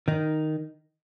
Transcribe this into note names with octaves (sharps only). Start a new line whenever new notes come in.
D#3 D#4